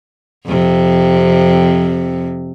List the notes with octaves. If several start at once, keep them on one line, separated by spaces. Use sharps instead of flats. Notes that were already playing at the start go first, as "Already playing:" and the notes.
F2 C3